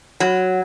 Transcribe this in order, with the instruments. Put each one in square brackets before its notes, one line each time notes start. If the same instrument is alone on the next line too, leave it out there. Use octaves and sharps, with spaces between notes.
[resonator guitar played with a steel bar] F#3